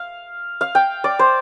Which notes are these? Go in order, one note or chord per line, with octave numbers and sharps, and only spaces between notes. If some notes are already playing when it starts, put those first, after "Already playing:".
Already playing: F5
F5
G5
D5
C5